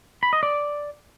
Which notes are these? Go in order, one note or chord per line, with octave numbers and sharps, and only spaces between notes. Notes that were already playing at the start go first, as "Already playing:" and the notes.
B5
D#5
D5